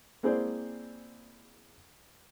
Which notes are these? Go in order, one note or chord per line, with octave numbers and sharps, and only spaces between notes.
A#3 C4 E4 G#4 C5 D5